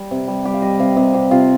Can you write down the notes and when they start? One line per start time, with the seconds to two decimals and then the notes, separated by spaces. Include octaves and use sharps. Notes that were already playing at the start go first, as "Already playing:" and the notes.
Already playing: G3
0.11 C3
0.28 G3
0.45 G3 G4
0.53 F5
0.62 G3 D#5
0.79 C3 F5
0.97 C3 D#5
1.13 C3 G4
1.31 C3 F4